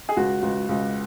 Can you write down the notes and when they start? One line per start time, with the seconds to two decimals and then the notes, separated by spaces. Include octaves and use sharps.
0.09 G#4
0.17 C#2 F#4
0.42 C#2
0.69 C#2